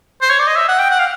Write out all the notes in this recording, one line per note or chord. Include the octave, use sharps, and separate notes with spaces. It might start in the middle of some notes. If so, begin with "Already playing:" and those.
C5
C#5
D5
D#5
E5
F#5
G5
F#5
F5